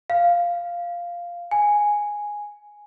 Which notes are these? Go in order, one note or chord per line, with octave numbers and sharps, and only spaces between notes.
F5
G#5